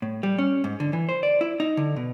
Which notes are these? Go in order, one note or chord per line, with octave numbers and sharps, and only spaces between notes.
A2
G3
C#4
G#2
D3
E3
C5
D5
E4
D#4
D3
B2